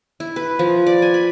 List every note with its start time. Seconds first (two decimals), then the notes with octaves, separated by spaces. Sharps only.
0.20 E4
0.36 B4
0.59 F3
0.87 D5
1.02 G#5
1.14 B5